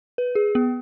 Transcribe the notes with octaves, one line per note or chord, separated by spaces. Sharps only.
B4
G#4
B3